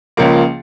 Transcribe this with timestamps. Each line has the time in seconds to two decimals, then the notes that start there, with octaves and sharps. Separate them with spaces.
0.17 C#2 C#3 F3 A#3